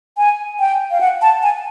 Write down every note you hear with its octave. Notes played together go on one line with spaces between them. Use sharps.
G#5
G5
F5
F#5
A5
G#5